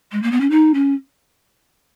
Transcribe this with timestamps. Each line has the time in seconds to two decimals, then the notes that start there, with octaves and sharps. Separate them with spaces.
0.11 G#3
0.22 A#3
0.31 B3
0.40 C#4
0.50 D#4
0.73 C#4